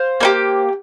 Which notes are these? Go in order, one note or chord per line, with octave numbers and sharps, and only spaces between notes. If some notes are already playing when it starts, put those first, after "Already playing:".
Already playing: C5 F5
A#3 D#4 G4